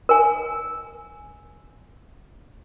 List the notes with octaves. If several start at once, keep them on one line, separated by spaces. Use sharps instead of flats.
A#4 G#5